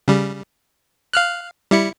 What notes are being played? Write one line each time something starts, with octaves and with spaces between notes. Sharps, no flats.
C#3 G3
F5 F6 F#6
G3 E4 C#7